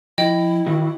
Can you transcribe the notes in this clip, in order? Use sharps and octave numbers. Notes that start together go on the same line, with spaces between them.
F3 E4 D#5 G5
D#3 E3 F4 F#4